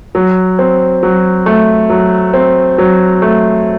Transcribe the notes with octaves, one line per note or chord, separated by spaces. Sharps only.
F#3
C4
F#3
A3
F#3
C4
F#3
A3